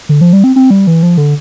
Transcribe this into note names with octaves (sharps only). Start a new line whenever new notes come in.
D3
F3
G3
C4
C4
G3
E3
F3
D3